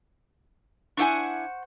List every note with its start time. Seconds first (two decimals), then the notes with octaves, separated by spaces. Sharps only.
0.97 D4 E4 C5 F#5 G#5 C#6